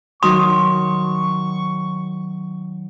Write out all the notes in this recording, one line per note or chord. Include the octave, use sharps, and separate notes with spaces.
D#3 F#3 D#4 C6 C#6 D#6